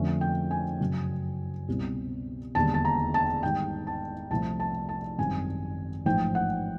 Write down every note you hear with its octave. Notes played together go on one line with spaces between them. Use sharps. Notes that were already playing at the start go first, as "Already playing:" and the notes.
Already playing: F2 D3 F3 A3 C#4
G5
G#5
F#2 C#3 F#3
C2 B2 G3 C4
E1 D#2 D3 G3 A5
A5
A#5
A5
G#2 D#3 G3 G5
A5
C2 C3 F3 A3 A5
A5
A5
G#1 F#2 D#3 G3 C4 G#5
A1 G#2 F3 G5
F#5